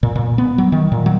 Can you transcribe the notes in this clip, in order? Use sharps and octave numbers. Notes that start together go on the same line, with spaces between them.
A#2
A#2
B3
F#3
D#3
A#2
F#3